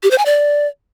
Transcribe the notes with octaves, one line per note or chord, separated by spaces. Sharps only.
G4
C5
G#5
D5